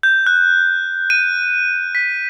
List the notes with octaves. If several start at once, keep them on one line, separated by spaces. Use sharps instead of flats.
G6
F#6
D#7
B6